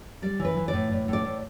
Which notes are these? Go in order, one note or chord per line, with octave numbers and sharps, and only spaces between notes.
G3 D5
E3
B4
E3
D5
A2
A2
A2
D5
A2